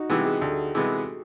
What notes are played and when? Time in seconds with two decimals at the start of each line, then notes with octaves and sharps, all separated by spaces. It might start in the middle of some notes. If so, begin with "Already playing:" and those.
Already playing: D#4 F#4
0.10 C3 E3 G#3 B3 G4
0.25 G#4
0.41 D2 A4
0.75 C3 E3 G#3 B3